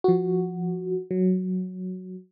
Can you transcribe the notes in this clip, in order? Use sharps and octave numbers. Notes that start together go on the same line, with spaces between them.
F3 F#4
F#3